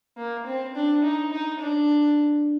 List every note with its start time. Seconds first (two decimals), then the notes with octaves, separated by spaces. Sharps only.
0.17 A#3
0.46 C4
0.75 D4
1.03 D#4
1.32 D#4
1.60 D4